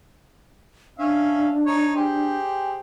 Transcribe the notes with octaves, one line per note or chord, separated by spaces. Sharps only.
C#4 D4 E5 F5
D#4 C#5
G4 G#4 C5